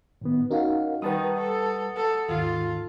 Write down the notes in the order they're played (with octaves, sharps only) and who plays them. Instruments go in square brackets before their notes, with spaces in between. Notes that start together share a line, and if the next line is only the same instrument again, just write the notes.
[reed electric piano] A2 D#3 B3
[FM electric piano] C#4 D#4 F#4 [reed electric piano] A#4 F5 F#5
[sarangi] D#3 [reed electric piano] G3 B4 [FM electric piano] F#5 A5 D#6
[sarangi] A4
A4
[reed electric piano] D#2 G#2 D#3 [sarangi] F4